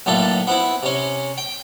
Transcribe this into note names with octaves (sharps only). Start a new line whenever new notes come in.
B1 A2 D3 A#3 A4 E5
B3 C4 E4
C3 C#4
G5